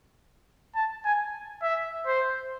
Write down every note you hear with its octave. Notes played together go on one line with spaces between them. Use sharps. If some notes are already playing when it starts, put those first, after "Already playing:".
A5
G#5
E5
C5